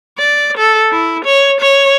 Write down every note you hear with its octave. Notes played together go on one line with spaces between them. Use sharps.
D5
A4
E4
C#5
C#5